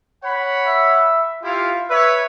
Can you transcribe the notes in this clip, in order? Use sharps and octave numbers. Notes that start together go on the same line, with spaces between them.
C#5 F#5 B5
E5
E4 F4 G4 F5
B4 C#5 E5